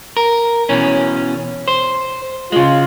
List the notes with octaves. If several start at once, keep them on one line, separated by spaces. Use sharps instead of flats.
A#4
B2 E3 C#4
C5
C#3 G#3 F4